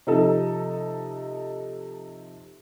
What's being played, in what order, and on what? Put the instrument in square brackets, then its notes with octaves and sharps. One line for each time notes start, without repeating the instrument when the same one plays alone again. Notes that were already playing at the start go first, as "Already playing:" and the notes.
[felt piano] C3 F3 D#4 A4